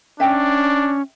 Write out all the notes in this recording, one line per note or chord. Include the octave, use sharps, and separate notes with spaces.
C#4 D4 E5 G5